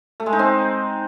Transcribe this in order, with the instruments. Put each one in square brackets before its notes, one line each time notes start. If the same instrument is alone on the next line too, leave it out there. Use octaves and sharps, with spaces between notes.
[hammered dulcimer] A3
G#3
D#4
C4